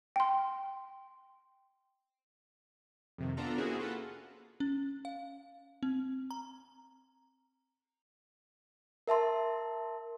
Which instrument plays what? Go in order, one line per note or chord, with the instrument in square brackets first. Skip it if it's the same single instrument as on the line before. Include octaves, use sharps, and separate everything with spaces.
[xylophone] G5 C6
[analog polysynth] F2 C3 D#3
B3 D4 F4 A4 A#5
A#3 C4 C#4 E4 F#4 G#4
F4 A4 B4 F#5
[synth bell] C#4
F5
C4
A#5
[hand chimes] A#4 E5 A5 C6